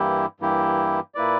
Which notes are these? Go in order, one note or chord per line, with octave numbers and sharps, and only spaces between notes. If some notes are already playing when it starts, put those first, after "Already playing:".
Already playing: G2 E3 A#3 E4 G4
G2 E3 A#3 E4 G4
A#2 A#3 E4 B4 D5